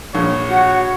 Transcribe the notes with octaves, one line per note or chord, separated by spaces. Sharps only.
A#1 C#5
F#4 F#5